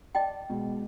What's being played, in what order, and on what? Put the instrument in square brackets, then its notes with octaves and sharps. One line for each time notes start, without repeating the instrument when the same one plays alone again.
[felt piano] D5 A5 [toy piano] D#5 G5
[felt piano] B2 [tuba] G#3